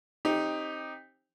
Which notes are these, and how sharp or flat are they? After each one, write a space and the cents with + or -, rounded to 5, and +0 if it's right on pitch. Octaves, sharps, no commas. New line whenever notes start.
C4 +25 D#4 +0 G4 +15